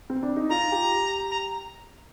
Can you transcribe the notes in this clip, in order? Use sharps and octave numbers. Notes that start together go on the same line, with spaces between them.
C4
D4
D#4
F4 A#5
G4
A#5